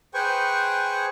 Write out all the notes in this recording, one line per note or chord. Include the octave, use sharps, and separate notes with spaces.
G#4 B4 C5 G5 G#5 C#6